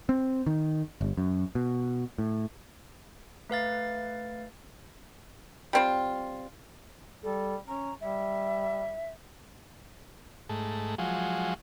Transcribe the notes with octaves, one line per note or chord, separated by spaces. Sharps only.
C4
D#3
G1
F#2
B2
A2
A3 B4 F5 A6
G3 C4 F4
G3 A4
C#4 A#5
G3 E5
G#2 A3
F3 F#3 G#3